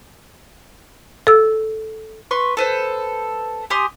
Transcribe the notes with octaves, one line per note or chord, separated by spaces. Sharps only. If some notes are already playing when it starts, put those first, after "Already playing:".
A4 E6
B4 C6 C#6
A4 B4 C5
G4 G#5 C6 D#6